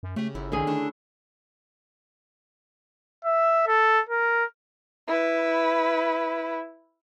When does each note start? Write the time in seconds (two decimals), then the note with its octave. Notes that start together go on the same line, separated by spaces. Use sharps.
0.03 F#2
0.16 C#3 A3 G4
0.35 G1 E4
0.52 B1 D3 D#3 C#4 G#4
0.67 A3 D4 E4
3.25 E5
3.67 A4
4.09 A#4
5.07 E4 B4